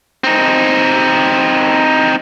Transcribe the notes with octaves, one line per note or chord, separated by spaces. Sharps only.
C4 D#4